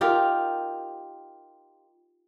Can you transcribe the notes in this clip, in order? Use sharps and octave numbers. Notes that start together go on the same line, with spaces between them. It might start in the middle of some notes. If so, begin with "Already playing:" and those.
D#4 F4 G4 A#4